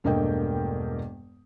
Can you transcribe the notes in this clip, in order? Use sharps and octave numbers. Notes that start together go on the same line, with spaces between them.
E1 G2 A3 A#3 D#5 G5